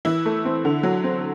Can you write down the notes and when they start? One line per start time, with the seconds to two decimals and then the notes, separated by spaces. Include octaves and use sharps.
0.05 E3 E4
0.25 A3
0.45 C4
0.65 D3
0.83 F#3
1.04 C4